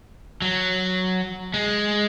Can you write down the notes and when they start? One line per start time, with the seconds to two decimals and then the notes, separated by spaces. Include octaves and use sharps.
0.42 F#3
1.54 G#3